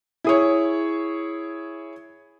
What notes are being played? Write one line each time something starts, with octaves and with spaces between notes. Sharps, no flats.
E4 G#4 C#5